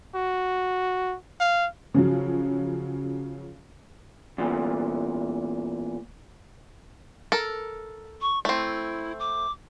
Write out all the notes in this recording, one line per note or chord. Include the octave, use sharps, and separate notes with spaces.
F#4
F5
C#3 F3 F#3
E2 A#2
A4 A#4
C#6
A3 C4 E4
D6